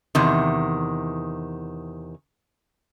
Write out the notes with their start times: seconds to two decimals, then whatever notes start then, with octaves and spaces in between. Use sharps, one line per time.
0.15 E2 C3 D#3